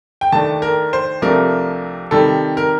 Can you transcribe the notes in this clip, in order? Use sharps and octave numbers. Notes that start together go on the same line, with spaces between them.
G5
D#2 D#3 A3 D4 A5
A#4
C5
C2 C3 F3 A3 D4 A#4
C3 D#3 G3 A4
A#4